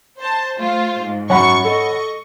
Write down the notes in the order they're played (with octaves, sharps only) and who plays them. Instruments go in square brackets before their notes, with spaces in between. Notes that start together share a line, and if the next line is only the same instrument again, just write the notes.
[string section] C5 A5
A3 F4 C5
G#2
[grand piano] F#2 [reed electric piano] C#5 F#5 B5 [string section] C#6
[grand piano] A4 [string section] D#5 C#6